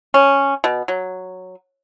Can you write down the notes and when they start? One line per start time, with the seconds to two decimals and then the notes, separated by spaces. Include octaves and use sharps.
0.14 C#4
0.64 B2
0.88 F#3